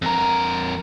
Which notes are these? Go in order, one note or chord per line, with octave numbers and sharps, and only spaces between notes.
F2 A#4